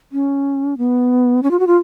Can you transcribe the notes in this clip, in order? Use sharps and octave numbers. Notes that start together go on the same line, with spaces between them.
C#4
B3
C#4
F4
F#4
F4